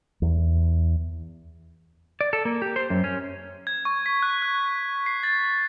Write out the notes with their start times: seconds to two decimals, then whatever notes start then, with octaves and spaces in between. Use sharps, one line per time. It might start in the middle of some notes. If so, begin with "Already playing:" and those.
0.22 E2
2.21 D5
2.33 A4
2.45 A#3
2.62 G4
2.76 C5
2.90 F#2
3.04 C#4
3.67 G#6
3.85 C#6
4.06 B6
4.22 F#6
4.42 F#6
5.06 C7
5.23 A6